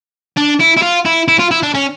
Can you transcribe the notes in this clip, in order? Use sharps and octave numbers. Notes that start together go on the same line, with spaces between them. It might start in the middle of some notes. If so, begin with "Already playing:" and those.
D4
E4
E4
F4
E4
E4
F4
E4
D4
C#4